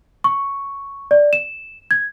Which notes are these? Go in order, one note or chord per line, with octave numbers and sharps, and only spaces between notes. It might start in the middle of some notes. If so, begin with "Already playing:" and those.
C#6
D5
E7
G#6